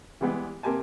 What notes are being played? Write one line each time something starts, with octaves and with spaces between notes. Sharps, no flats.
E3 G3 G#3 B3 G4
C3 A#3 G4 G#5 A5